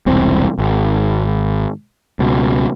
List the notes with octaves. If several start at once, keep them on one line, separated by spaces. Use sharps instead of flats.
E1 C2 C4
G#1
C#2 B2